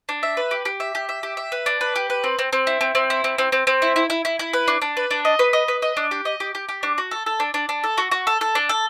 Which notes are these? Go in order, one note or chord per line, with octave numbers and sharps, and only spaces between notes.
D4
E5
B4
G4
G4
E5
G4
E5
G4
E5
B4
D4
B4
G4
B4
C4
C4
C4
E4
C4
C4
E4
C4
C4
C4
C4
E4
E4
E4
E4
E4
B4
D4
D4
B4
D4
D#5
B4
D#5
B4
D#5
D4
G4
D#5
G4
G4
G4
D4
F#4
A4
A4
D4
D4
D4
A4
F#4
F#4
A4
A4
D4
A4